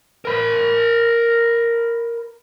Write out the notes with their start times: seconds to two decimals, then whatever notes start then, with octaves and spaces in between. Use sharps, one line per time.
0.25 A#4 B5